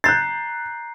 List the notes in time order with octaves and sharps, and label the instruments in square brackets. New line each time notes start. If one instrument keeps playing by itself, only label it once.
[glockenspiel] A#5 C7 [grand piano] F#6 G6 A6